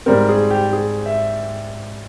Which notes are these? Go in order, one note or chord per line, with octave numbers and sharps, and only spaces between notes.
G#2 G3 C4 A#4
G#4
G4
G#4
E5